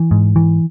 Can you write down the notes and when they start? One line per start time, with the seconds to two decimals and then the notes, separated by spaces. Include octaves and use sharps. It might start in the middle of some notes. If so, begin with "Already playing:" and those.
Already playing: E3
0.11 G#2
0.36 E3